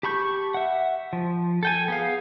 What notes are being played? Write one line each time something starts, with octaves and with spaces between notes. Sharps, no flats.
G4 A5 B5 C#6 G6
E5 F#5
F3
A4 G5 G#5
B3 G#4 F5